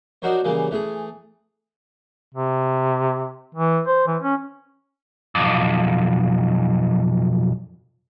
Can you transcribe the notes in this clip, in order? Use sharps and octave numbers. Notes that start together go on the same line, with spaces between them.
D4 D#4 F#4 A#4 C5 C#5
C#3 E3 G3 A#3
E3 A3 G#4
C3
E3
C5
E3
C#4
B1 F2